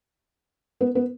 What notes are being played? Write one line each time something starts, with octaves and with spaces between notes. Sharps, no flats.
B3
B3